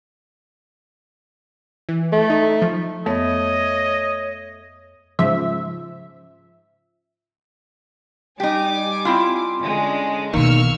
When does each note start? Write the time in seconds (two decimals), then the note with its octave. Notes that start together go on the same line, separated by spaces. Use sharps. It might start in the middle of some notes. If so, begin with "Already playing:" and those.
1.89 E3
2.13 A3
2.30 D#4
2.62 F3
3.06 F2 A3 B3 C#5 D#5 E5
5.19 G#2 C#3 F3 E5
8.40 G3 D#4 G4 G#5 D6
9.05 C4 E4 F4
9.61 D3 G#3 C#4
10.33 B2 D#3 E3 A#3 C#6 E6 F6